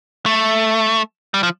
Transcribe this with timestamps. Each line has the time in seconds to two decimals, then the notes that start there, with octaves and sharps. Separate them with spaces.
0.26 A3
1.34 G3
1.43 F3